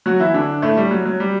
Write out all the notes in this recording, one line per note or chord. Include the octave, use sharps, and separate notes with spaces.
F#3 F#4
E3 E4
D3 D4
A2 A3
G3
F#3
F#3
G3